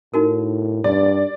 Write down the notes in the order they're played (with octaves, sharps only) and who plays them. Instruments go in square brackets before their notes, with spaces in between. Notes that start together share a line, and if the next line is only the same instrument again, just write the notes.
[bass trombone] A2 [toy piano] D#4 F#4 A#4
[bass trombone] G2 [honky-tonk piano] D5